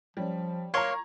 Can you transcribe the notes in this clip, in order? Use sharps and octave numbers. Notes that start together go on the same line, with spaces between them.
F3 G3 C#4
A#3 C#5 A#5 C6 C#6 G#6